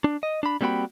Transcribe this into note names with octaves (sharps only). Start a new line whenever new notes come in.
D4
D#5
D4 B5
G3 A#3 C4 F#4 G5 B5